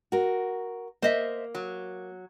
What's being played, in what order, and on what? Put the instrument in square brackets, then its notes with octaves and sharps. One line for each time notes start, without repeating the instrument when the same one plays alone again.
[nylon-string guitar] F#4 A#4
[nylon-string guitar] A#3 [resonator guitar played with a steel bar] C5 D#5 E5
[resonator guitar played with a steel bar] F#3